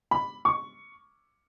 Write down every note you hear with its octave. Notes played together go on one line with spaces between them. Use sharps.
B5
C#6